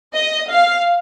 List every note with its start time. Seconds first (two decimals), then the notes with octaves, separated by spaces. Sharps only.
0.14 D#5
0.51 F5